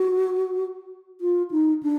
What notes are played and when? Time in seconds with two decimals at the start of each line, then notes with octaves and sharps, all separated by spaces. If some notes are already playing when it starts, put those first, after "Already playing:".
Already playing: F#4
1.21 F4
1.51 D#4
1.83 D4